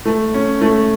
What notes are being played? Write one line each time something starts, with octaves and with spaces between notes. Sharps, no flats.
A3
C#4
A3